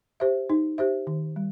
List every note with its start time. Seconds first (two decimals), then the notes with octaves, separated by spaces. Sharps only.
0.20 G4 C5 E5
0.50 D#4
0.78 G4 C5 E5
1.07 D#3
1.36 G3